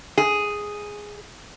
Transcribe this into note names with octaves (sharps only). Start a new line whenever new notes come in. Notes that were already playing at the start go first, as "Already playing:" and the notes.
G#4